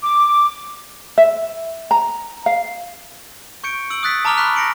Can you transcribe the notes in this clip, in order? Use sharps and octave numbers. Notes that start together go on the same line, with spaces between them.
D6
E5
A#5
F5
C#6 G6 C#7 D7
E6 D7 F#7
D#6 E6 F#6 A6 B6
A5 A#5 D6 F6 F7 G7
B5 C#6 F6 F#6 B6 F7
A#6 C#7 D7 F#7